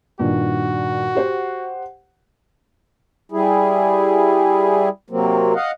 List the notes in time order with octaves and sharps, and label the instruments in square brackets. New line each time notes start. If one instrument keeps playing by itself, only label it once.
[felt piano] G2 A#2 D#3 [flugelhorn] F#4
[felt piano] G4 C5 F#5
[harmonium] G3 E4 G#4
C3 F#3 A#3 C4
D#5 F5 F#5